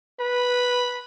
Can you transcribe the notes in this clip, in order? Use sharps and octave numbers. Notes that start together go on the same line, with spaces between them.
B4 B5